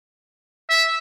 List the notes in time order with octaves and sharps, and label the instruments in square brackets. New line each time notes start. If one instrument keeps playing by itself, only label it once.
[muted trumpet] E5